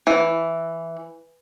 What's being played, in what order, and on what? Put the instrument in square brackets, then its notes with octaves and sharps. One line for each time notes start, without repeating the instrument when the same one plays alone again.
[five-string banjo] E3